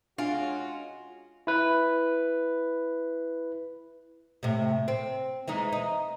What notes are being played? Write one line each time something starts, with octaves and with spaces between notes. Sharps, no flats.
G#3 C#4 D4 F4 F#4 G#5
E4 B4
A2 C3
C4
E3 G#3 D#4
D#4